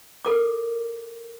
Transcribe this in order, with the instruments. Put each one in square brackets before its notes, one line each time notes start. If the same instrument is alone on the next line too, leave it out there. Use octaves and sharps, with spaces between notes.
[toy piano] A4 A#4 D6